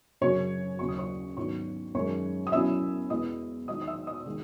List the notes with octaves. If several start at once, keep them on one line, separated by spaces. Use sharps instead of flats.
F#2 C#3 F#3 C#5 C#6
D#2 C#3 F#3 C#6
D#6
C#5 C#6
G#2 D#3 F#3 B3 D#4 C#5 C#6
F#2 D#3 G#3 C#5 C#6
D#6
B2 F#3 C#4 E4 E5 E6
E2 B2 G#3 B3 E4 D#5 D#6
E2 D#3 G#3 D#4 D#5 D#6
D#6
E5 E6
D#5 D#6
D#3 G#3 D#4